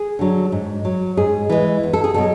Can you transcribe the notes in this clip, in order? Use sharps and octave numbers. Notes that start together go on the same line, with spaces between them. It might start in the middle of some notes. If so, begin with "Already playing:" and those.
Already playing: G#4
D3 F#3
G#2
F#3
G#2 G#4
E3 G#3
E2
A4
G#4
B2 F#3 A4